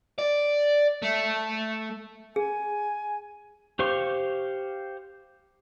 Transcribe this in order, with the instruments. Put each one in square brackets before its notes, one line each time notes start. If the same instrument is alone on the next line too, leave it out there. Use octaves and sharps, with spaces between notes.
[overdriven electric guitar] D5
A3
[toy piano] G#4 [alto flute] G#5
[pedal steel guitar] G4 C5 F5 C#6